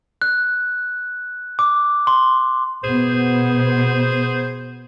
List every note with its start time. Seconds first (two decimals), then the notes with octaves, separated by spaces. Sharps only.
0.22 F#6
1.59 D6
2.07 C6
2.84 B2 B3 G#4 C5